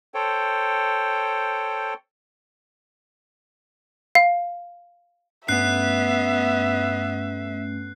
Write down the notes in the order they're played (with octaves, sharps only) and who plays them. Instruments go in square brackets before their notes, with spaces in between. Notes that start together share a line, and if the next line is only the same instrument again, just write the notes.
[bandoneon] A4 C5 C#5 G5
[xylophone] F5
[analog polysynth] G2 A3 C#4 [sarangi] B3 [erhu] E5 [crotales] F#6 C7